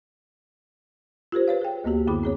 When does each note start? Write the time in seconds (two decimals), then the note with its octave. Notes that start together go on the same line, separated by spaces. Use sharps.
1.32 F4 G4 A#4 C5
1.48 B4 C#5 F5
1.62 G#4 G5
1.84 D2 A#3 B3 F#4 G4
2.07 F#2 D3 E4 G#4 B5 D6
2.23 C4 G#4 C#5